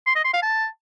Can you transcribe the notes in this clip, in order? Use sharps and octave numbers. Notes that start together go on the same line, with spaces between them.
C6
D#5
C6
F5
A5